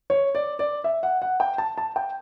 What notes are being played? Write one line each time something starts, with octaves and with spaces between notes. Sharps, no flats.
C#5
D5
D5
E5
F#5
F#5
G5
A5
A5
G5